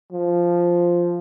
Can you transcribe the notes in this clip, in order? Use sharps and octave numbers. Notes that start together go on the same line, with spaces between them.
F3